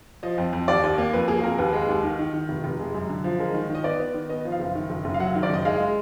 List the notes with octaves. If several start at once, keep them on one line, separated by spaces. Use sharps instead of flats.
F3 D#5
F2
F2
D#2 D5
D#2
A#3
F2 B4
A#3 G#4
G#4
F2 A#4
D#2 B4
G#3
D#2
D#3
D#3
D#3
F1
F1
G#3
F#2
D3
F3
G#3 A#4
D#3
D#3
D#5
B3 D5
B3
D#3
B3 D#5
F3
F5
F#1
D#3
F#1
F#1
F5
F#3 F#5
D#3
D5
F#1 D#5
G#3 F5
G#3